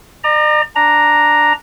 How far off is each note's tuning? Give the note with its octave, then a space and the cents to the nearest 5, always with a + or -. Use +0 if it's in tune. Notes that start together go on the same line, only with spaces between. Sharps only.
D5 +45 A#5 +0
D4 +0 A#5 +0